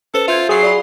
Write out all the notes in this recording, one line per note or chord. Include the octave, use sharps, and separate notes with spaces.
C#4 A4 B4 C5
F4 E5 G6 G#6
F#3 G#4 C7
D5 F5 B5